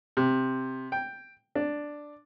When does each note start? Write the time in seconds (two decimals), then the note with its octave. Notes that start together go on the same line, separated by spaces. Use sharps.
0.17 C3
0.92 G5
1.55 D4